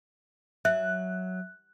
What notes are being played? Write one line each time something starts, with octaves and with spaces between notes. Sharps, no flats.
F#3 E5 F#6